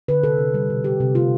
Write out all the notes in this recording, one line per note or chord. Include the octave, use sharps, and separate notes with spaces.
D3 B4
C3 A4
C3
G3
B2
G3 G4
C3
A3 F4